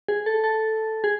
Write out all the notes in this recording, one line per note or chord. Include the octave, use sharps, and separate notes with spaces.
G#4
A4
A4
G#4